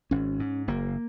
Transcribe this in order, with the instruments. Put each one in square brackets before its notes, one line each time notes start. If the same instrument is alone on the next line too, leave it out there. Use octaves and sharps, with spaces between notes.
[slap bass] G#1 C#4
G#2
F#1 A#3